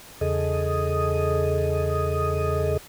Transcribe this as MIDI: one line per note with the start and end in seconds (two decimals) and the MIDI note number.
0.21 2.77 40
0.21 2.77 49
0.21 2.77 68
0.21 2.77 69
0.21 2.77 75
0.21 2.77 87